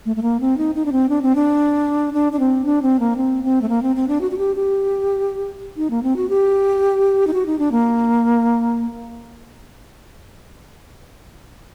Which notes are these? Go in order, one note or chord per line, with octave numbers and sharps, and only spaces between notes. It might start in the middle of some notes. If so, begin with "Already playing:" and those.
A3
A3
A#3
C4
D#4
D#4
D4
C4
D4
C4
D4
D4
D4
C4
D4
C4
A#3
C4
C4
A3
A#3
C4
C4
D4
F#4
F#4
G4
G4
D#4
A#3
C4
F#4
G4
D#4
F#4
D#4
D4
A#3